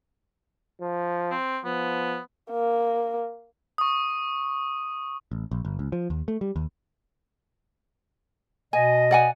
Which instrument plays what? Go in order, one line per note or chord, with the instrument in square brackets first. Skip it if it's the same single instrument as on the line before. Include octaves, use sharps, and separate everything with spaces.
[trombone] F3
[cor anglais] C4
[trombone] F3 [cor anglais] B3
[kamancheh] A#3
[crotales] C#6 D#6
[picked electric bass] A1
A#1
G1
C#2
F3
D#2
A3
G3
D#2
[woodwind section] B2 D#5 [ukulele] G#5
[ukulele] D5 F#5 G#5